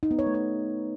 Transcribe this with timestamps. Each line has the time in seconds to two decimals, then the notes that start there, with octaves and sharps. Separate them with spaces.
0.03 D#4
0.11 B3
0.19 C#5
0.27 A3
0.34 C#5